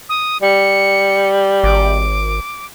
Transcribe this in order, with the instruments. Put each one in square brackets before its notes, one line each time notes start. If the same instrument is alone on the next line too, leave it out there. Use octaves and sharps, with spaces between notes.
[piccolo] D#6
[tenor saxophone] G3 [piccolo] C#7
[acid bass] G#1 [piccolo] D6